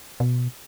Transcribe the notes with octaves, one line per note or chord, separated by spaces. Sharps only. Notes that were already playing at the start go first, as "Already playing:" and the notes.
B2